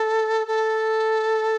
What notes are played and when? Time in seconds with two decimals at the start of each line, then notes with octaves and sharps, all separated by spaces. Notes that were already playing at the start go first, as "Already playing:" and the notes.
Already playing: A4
0.47 A4